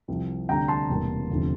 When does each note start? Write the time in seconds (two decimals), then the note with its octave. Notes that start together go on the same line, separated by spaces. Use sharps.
0.08 C2 C3 F3 C4
0.49 D2 C3 G3 D4 G5 A#5
0.68 A5 C6
0.90 E1 E2 C3 G3 A#3
1.30 E1 D2 C3 F3